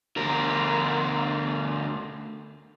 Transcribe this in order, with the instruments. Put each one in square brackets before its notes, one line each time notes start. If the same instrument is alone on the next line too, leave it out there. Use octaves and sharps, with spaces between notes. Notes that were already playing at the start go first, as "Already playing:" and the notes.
[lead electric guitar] D2 A#4